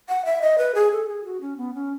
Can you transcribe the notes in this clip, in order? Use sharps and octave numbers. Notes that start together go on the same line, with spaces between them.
F#5
E5
D#5
B4
G#4
A4
G#4
F#4
C#4
B3
C#4